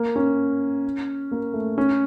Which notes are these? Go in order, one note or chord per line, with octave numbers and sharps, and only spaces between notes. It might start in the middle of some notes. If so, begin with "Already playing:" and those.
Already playing: A#3
C#4
A#3
A3
C#4